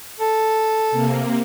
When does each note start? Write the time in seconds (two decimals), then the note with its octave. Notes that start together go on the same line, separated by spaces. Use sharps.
0.20 A4
0.91 C3 A#3